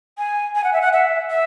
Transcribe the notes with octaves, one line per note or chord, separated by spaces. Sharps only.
G#5
G#5
F#5
E5
F#5
E5
E5